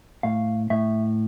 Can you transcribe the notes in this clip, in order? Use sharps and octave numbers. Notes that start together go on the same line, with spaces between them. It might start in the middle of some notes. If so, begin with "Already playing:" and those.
A2 F5
A2 E5